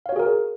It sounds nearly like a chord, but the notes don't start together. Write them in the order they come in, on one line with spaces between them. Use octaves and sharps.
F5 C#5 F#4 G#4 A#4